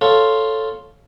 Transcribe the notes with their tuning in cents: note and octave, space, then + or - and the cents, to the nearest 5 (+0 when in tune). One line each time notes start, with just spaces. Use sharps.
F4 +0 A4 +0 C#5 +0